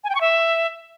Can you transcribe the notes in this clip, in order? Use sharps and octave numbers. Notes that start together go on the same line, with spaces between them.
G#5
G5
C#6
E5